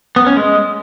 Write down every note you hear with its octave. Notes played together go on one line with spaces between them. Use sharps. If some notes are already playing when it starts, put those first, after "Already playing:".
B3
C#4
G#3